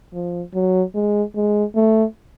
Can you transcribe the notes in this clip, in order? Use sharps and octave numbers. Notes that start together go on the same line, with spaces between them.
F3
F#3
G#3
G#3
A3